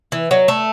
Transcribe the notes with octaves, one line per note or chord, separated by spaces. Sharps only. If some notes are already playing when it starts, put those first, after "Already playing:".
E3
F#3
A3